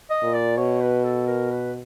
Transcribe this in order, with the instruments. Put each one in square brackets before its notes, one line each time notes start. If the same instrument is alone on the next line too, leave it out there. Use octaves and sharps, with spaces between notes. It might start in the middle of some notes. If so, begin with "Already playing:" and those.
[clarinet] D#5
[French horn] A#2
[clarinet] D5
[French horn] B2 [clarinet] C#5
[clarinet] B4
A4
A#4
B4